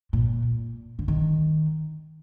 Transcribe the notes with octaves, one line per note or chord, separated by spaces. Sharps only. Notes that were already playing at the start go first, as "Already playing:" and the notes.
A#2
D3
D#3